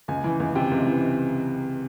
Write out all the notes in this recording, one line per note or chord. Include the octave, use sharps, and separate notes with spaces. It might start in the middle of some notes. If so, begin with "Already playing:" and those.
C#2 G#5
E3
C#2
C3 G5
C#2
E3